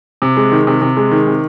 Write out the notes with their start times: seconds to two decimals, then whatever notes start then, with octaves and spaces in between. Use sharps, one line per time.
0.22 C3
0.37 G#3
0.52 D#3
0.67 C3
0.82 C3
0.97 G#3
1.11 D#3
1.26 C3